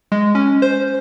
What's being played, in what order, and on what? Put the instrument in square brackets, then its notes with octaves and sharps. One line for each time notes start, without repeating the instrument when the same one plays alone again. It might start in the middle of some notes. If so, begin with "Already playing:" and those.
[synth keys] G#3
C#4
C5